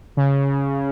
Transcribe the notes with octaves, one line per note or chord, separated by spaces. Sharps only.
C#3